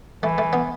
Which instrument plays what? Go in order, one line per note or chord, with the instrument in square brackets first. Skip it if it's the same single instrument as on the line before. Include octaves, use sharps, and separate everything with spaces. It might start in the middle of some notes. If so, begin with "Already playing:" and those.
[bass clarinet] E3 [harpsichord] A3
[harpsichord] A3
B3